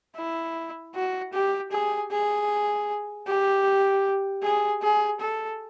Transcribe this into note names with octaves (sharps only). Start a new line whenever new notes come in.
E4
F#4
G4
G#4
G#4
G4
G#4
G#4
A4